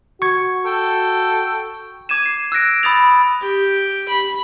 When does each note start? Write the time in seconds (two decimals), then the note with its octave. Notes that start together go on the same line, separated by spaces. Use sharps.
0.22 F#4 C#6 G#6
0.66 A4 G5
2.09 D6 G#6 D#7 E7
2.26 C7
2.52 E6 F#6 A#6 D7
2.83 B5 D#6 A6 F7
3.42 G4
4.08 B5